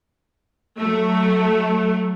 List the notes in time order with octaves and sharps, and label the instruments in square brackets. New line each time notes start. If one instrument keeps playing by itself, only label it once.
[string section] F#3 A3